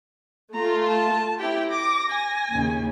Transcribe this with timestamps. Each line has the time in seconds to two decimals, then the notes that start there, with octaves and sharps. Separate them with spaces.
0.54 A3 F4 A#5
0.86 A5
1.40 C4 E4 G4 G5
1.70 D6 A#6
2.10 G#5
2.52 D#2 C#3